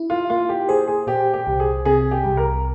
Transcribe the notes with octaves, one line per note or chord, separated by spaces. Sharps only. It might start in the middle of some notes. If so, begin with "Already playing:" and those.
Already playing: E4
F4
A#3 F4
G4
G#4 C5
G#4
A#2 G4
G4
C2
G#4
C3 G#4
G4
C2
A#4